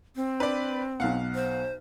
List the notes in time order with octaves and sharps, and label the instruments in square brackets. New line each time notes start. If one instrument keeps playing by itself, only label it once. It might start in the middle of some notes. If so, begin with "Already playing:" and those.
[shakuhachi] C4
[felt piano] D4 [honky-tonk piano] B4 D5
[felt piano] B1 B2 [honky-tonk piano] F5 F#5
[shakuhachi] C5